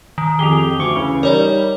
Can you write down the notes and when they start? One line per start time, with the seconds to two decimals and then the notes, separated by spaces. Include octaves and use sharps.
0.18 D#3
0.39 F2 G4 G#4 F7 G7
0.79 D2 C#6 D6
0.96 C#3 E3
1.23 G3 D#4 A#4 C#5 D5